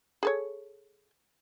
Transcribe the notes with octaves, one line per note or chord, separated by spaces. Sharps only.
G#4 A4 C#5